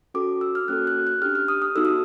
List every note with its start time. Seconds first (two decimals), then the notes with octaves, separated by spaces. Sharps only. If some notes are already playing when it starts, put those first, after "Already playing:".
0.14 C#4 F#4 A4 D6
0.41 E6
0.55 F6
0.68 A#3 C#4 F#4 A4 F#6
0.87 F#6
1.07 F#6
1.22 D4 G4 F6
1.35 F6
1.48 D#6
1.62 D#6
1.75 B3 D#4 F#4 A4 E6
1.85 D#6